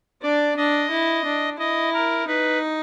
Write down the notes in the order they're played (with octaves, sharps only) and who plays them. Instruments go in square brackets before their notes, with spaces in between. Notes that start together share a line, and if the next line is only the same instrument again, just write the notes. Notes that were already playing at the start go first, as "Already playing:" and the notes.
[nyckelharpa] D4 [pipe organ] D5
[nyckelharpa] D4 [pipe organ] D#5
[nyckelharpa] E4
D4
[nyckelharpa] E4 [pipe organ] D#5
[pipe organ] A#4
[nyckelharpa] D#4 [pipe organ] B4